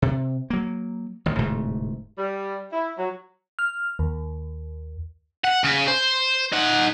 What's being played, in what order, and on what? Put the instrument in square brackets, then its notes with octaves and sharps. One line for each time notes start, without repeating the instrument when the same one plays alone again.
[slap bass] C3
F#3 A#3
A1 D#3
D1 G#2 C3 A3
[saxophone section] G3
E4
F#3
[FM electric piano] F6
D#2
[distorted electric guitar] F#5
C#3
C5
D#4 F#5